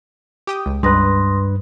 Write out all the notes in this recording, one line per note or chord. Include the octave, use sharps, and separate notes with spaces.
G4 G5 D#6
C#2
C#2 G2 B4 C6 D#6 A#6